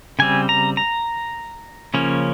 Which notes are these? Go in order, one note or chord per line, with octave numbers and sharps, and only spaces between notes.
C#3 G3 C4 G#5
A#5
A#5
C#3 F3 A#3 C#4